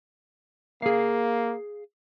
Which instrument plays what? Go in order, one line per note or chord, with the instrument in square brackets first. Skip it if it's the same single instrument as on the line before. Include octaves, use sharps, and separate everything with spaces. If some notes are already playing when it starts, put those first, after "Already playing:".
[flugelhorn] A#3 [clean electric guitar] G#4 F5